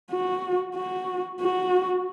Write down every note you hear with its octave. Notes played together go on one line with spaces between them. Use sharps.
F#4
F#4
F#4